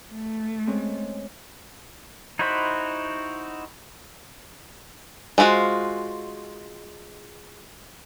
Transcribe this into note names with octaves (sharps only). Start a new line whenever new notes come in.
A3
G#3 C4 C#4
D#4 E4 F#4 C5 B5
G#3 D4 F4 F#4 C5